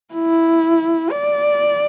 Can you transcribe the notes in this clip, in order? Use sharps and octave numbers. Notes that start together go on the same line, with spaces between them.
E4
D5